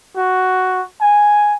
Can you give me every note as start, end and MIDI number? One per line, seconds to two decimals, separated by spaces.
0.16 0.82 66
1.01 1.55 80